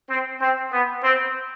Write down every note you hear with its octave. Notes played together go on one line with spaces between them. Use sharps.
C4
C4
B3
C4